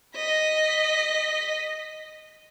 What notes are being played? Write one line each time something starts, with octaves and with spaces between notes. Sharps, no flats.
D#5 B6